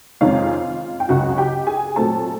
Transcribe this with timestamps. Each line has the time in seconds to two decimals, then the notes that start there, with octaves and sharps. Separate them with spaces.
0.21 F2 C3 D#3 G#3 C#4 F4 F5
1.00 G5
1.08 C#2 C#3 F#3 F#4 F#5
1.37 G4 G5
1.67 G#4 G#5
1.96 A#2 F#3 A3 C4 A4 A5